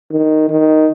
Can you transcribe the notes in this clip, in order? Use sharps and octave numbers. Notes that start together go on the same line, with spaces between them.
D#3
D#3